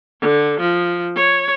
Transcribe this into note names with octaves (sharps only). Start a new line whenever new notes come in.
D3
F3
C#5